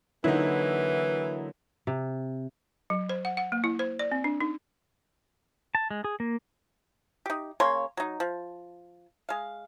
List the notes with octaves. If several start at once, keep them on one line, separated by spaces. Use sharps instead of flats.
D3 E3 F#3 A#3 D#4 E4
C3
F#3
C5
F#5
F#5
A#3
E4
C5
D5
C4
D4
D#4
A5
G#3
G#4
A#3
D#4 G4
C#3 A#3 C#5 C6
F#3 D#4
F3
G#3 F5